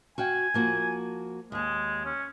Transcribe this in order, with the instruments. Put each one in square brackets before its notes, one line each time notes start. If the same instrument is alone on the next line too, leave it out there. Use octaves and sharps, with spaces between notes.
[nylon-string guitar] F#4 F5 G5 [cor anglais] G#5
[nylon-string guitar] F3 A#3 F#4
[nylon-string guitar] D#2 C#5 [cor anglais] G#3
[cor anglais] C#4